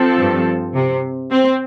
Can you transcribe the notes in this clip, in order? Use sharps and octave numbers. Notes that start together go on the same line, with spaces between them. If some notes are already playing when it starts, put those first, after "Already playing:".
Already playing: F3 C4 A4
G2
C3
C4